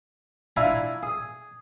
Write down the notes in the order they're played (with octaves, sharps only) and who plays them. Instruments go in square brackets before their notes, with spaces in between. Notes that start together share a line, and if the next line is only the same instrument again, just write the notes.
[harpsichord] D4 E4 F4 G#5 A#5 B5
G#4